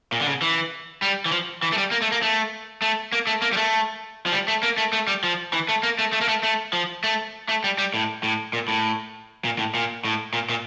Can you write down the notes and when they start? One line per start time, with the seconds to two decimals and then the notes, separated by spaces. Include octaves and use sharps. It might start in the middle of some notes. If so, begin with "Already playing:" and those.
0.12 A#2
0.21 D3
0.27 C#3
0.42 E3
1.02 G3
1.26 E3
1.32 F3
1.63 E3
1.72 A3
1.78 G3
1.91 A#3
2.02 A3
2.12 A#3
2.22 A3
2.82 A3
3.13 A#3
3.27 A3
3.42 A#3
3.53 G3
3.57 A3
4.26 F3
4.32 G3
4.48 A3
4.63 A#3
4.78 A3
4.93 A3
5.07 G3
5.23 F3
5.53 E3
5.69 A3
5.83 A#3
5.99 A3
6.13 A3
6.21 A#3
6.28 A3
6.43 A3
6.73 F3
7.04 A3
7.49 A3
7.64 G3
7.78 G3
7.94 A2
8.23 A2
8.53 A#2
8.68 A2
9.44 A#2
9.58 A2
9.74 A#2
10.04 A2
10.33 A#2
10.49 A#2